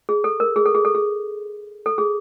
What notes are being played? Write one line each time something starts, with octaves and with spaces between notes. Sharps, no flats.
G#4
A4
A#4
G#4
A4
G#4
A4
G#4
A4
G#4